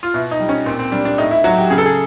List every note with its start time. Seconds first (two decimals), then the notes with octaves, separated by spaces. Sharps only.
0.03 F4
0.14 B2 E4
0.31 D#4
0.40 G3
0.49 C#4
0.66 A#2 C4
0.79 C4
0.92 G3 D4
1.05 D4
1.18 A2 D#4
1.31 E4
1.44 F#3 F#4
1.57 G4
1.70 C#3 G#4
1.78 A4
1.86 G#4